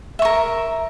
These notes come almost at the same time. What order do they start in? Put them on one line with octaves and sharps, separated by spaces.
E5 C#6 A#4